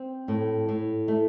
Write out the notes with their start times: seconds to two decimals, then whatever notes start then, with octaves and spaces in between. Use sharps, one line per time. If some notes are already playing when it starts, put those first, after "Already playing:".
Already playing: C4
0.28 A2
0.69 A2
1.08 A3